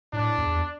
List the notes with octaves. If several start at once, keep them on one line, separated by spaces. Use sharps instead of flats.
A2 D4
E2